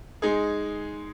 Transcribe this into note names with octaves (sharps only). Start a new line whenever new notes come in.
G#3 D#4 G#4